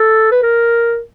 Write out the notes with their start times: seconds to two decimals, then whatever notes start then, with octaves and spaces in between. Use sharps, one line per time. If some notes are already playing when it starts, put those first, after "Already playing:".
Already playing: A4
0.31 B4
0.42 A#4